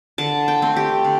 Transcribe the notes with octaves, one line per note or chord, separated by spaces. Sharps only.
D3 A5
G5
A3 C4
G4
D3